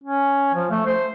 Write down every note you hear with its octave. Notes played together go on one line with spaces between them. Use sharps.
C#4
F3
A3
C5